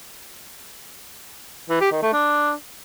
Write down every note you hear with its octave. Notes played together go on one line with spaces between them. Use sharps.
E3
G4
D#3
A3
D4